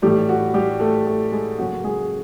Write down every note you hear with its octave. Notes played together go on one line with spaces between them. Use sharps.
A2 E3 G3 A3 G4
F#4
G3 G4
A3 A4
A3 A4
G#3 G#4
F#2 C#3 F#3 A#3 C#4 F#4
G#3 G#4